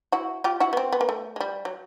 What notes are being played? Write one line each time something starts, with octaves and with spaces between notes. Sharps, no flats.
E4 F#4
F4 G4
E4 F#4
B3
C4
B3
A#3
A3
G#3
G3
F#3